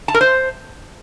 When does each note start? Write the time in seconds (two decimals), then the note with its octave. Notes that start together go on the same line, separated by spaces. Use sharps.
0.08 A5
0.14 A#4
0.21 C5